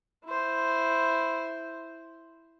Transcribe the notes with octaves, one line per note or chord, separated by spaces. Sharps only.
E4 C5